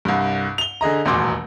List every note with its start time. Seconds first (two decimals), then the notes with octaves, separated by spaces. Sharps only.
0.05 C2 G2
0.58 F7 G7
0.81 D3 G#4 D#5 A#5
1.05 D#1 A1 E2 B2 C6 D6